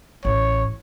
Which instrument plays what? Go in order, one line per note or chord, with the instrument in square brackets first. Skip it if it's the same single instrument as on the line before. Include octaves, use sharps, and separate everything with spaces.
[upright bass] A1 [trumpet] C#5